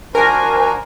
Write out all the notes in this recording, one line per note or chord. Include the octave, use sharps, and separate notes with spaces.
D4 F#4 A#4 C5 G#5 A#5